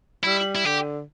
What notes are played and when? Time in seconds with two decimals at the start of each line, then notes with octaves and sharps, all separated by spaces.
0.24 G3 E4
0.55 E4
0.65 D3 G4